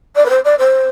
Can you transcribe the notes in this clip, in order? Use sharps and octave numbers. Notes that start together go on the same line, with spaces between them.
D5
B4
C5
D5
C5